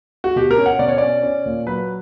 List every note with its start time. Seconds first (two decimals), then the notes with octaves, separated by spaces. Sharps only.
0.24 F#4
0.36 B2 G4
0.51 A#4
0.58 C#4
0.66 F#5
0.79 B2 D5
0.88 C#5
0.98 C#4 D5
1.23 C#4
1.46 A#2
1.66 F#3 B4